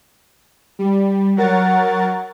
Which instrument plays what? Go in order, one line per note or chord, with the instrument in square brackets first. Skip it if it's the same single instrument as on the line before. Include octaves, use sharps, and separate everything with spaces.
[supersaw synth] G3
F#3 F#4 A#4 F#5 A6